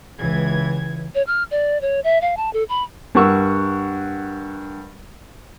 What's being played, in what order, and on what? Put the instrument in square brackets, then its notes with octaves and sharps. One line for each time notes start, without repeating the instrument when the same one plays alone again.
[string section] C#2 E3 G#6
[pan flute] C#5
F6
D5
C#5
E5
F5
A5
A4
B5
[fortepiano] G2 A#4 F#5 C#6 E6